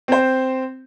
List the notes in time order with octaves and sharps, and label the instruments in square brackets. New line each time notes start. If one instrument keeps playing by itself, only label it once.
[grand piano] C4 C5